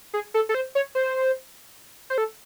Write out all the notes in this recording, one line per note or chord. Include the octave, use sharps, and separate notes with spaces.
G#4
A4
A4
C5
C#5
C5
C5
A4